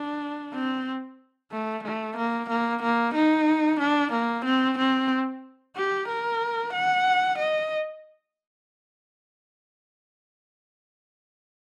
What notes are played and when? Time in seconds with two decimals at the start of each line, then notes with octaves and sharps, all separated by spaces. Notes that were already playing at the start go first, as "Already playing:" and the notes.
Already playing: D4
0.54 C4
1.52 A3
1.84 A3
2.16 A#3
2.49 A#3
2.82 A#3
3.14 D#4
3.79 D4
4.12 A#3
4.45 C4
4.78 C4
5.76 G4
6.08 A#4
6.73 F#5
7.38 D#5